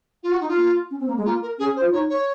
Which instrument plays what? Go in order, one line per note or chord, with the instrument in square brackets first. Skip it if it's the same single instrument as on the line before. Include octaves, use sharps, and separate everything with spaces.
[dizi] F4
F#4
D#4
F4
[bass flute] A#3
C#4
C4
A#3
G#3
[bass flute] A#3 [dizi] F4
[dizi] A#4
[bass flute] C#4 [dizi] G#4
[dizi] C5
[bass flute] F4
[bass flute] D#4 [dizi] C#5
[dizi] C#5